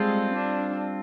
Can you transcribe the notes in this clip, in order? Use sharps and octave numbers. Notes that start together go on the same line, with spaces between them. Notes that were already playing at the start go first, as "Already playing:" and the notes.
Already playing: G3 G#3 C4 F4 A4
D4